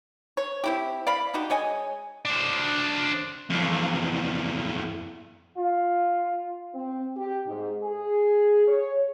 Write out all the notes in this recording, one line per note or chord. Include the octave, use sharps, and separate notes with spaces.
C#5
C4 E4 G4
D5 F5 B5
D3 D#4 F#4 G4
G#3 C#5 D#5 G#5
D4 C5
F2 E3
F4
C4
G4
G#2
G#4
C#5